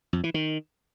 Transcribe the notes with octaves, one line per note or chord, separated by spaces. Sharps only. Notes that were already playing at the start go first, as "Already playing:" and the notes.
F2
E3
D#3